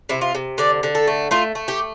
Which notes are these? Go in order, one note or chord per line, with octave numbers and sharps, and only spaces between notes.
C3 E4
F4
C3
D3 D5
D3
A4
A3
A3 F4
A3
G4